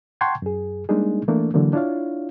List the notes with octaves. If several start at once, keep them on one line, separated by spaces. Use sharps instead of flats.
F#5 G5 A5 C6 C#6 G#6
F#2 G#4
G3 G#3 A#3 D4 D#4 G#4
E3 A3 A#3 D4
D3 E3 F#3 A#3
D4 E4 F4 C#5 F5